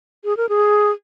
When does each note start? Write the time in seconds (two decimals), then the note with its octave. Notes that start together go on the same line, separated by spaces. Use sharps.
0.24 G#4
0.37 A#4
0.49 G#4